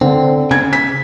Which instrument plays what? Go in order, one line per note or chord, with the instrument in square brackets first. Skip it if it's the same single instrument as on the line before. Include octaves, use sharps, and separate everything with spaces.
[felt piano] D3 [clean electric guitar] C4
[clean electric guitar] C#3 [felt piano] G#6
[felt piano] B6